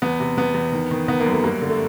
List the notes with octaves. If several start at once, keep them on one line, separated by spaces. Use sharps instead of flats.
E2 B3
C3
E2 B3
E2
D#3
D#3
D#3 B3
A#3
F#2
A3
G2 A#3
D3
A3